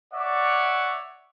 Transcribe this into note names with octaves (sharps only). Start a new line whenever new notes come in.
C#5 D5 E5 F#5